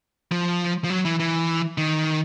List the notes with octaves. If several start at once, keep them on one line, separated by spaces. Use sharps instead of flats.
F3
F3
F#3
E3
E3
D#3